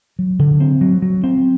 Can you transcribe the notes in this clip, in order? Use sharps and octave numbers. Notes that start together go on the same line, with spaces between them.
F#3
D3
C4
F#3
F#3
C4